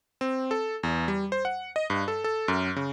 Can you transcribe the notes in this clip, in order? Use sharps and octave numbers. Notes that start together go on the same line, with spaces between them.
C4
A4
E2
G3
C5
F#5
D#5
G2
A4
A4
F#2
C#3